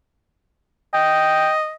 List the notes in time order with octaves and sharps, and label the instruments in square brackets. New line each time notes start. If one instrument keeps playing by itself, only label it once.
[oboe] D#5 [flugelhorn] G5